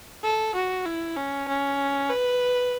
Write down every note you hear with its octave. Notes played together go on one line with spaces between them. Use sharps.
A4
F#4
E4
C#4
C#4
B4